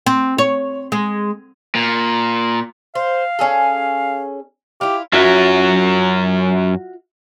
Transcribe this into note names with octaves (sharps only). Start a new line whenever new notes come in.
C4
C#5
G#3
A#2
C5 F5
C#4 G#4 A4
E4 F4 G4
F#2 F#3 F4 F#4 E5